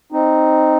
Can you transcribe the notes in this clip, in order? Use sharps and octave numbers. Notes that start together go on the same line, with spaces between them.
C4 D#4